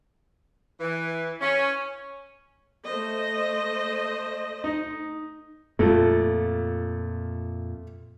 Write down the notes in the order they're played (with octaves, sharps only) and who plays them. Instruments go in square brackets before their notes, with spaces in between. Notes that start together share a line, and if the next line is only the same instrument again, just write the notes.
[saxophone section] E3
C#4
[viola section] A3 C5 D#5
[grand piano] D#4
[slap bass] F2 A#2 [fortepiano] A3 F4